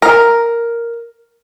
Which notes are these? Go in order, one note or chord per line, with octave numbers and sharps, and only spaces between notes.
A#4